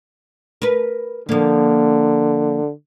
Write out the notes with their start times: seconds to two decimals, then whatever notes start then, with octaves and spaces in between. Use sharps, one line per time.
0.62 A#4 B4
1.29 D3 F3 A#3